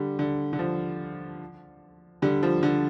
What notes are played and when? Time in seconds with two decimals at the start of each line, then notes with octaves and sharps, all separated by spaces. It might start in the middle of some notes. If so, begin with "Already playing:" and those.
Already playing: D3 G3
0.19 D3
0.53 D3
0.59 F3
2.22 D3 G3
2.43 F3
2.63 D3